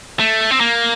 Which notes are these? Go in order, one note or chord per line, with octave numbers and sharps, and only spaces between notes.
A3
C4
A#3